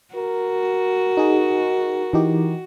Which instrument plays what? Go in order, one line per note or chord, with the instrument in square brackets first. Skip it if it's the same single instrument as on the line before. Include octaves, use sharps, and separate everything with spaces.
[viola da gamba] F#4 [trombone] A#4
[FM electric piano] D#4 G#4
E3 D#4 G4